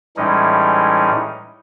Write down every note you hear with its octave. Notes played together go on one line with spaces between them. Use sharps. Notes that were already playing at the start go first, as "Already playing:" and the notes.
A2 E3 G3 G#3 C#4 D#4